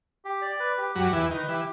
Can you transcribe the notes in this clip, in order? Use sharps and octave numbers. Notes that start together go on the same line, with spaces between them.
G4
D5
B4
G4
F#2 F#3 G4
E2 E3 B4
D#3 B4
E3 G4